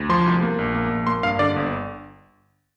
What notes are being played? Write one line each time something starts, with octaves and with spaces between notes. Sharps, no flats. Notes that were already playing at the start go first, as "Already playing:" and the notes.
Already playing: D2
F3 C6
C2
A#3
A#1
A#3
A#1
A#3 C6
G2 F5
D3 D5
G1